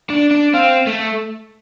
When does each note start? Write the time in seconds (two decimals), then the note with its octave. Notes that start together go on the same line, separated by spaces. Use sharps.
0.10 D4
0.31 D4
0.54 C4 F5
0.87 A3